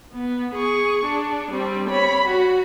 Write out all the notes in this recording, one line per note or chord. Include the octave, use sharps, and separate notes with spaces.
B3
G#4 C#6
D4
G3 C4
C#5 B5
F#4